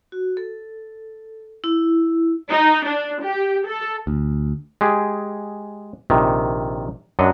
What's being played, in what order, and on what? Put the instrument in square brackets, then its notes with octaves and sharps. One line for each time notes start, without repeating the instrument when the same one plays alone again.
[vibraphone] F#4
A4
E4
[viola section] D#4
D4
G4
A4
[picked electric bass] D2
[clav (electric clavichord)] G#3 G4 G#4
A#1 C3 D#3
F#2 F#3 D4 D#5 F#5